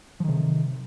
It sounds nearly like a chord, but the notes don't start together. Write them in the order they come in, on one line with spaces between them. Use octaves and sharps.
F3 D#3 C3